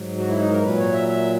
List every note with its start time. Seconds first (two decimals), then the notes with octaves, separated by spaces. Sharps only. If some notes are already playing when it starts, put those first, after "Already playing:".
Already playing: G#2 F#3
0.18 F#4
0.29 E4
0.40 D#4
0.51 A#4
0.63 A#2 F#3 B4
0.78 C#5
0.93 E5
1.08 E5